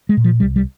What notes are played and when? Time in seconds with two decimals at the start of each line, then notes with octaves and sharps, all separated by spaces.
0.09 G#3
0.17 A#2
0.24 F3
0.40 C2 G3
0.56 G3